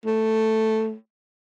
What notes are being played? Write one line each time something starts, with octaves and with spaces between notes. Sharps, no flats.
A3